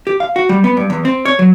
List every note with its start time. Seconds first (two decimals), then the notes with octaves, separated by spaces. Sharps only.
0.07 G4
0.20 F5
0.36 F#4
0.49 G3
0.64 B3
0.77 G2
0.90 E2
1.05 C4
1.25 C#5
1.39 F#3